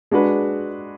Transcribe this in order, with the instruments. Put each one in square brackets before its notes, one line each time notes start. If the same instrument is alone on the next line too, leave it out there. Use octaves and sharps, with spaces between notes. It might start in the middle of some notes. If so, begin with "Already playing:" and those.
[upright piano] G#3 D4 F#4 B4